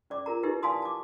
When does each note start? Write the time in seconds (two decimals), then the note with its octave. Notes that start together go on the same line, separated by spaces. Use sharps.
0.10 C#4 D5 D6
0.26 F4 A#4 A#5
0.43 D#4 E4 G4 B4
0.63 D5 F5 G#5 A5 C6 D#6
0.82 A5 D6